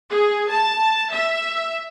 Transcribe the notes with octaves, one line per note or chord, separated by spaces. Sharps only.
G#4
A5
E5